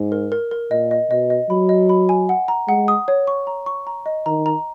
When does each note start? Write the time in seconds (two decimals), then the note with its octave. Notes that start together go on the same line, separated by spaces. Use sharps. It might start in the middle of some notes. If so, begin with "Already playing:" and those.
Already playing: G#2
0.12 A#4
0.32 A#4
0.51 A#4
0.71 A#2 D#5
0.91 D#5
1.11 B2 D#5
1.30 D#5
1.50 F#3 B5
1.69 D#5
1.89 B5
2.09 G#5
2.29 F#5
2.48 A#5
2.68 G#3 F#5
2.88 D#6
3.08 C#5
3.27 C#6
3.47 A#5
3.66 C#6
3.87 A#5
4.06 D#5
4.26 D#3 A#5
4.46 A#5